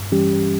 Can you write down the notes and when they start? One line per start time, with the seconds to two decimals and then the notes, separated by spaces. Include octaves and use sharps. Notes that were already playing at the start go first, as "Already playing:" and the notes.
Already playing: G2
0.12 E3 G3 C#4 G4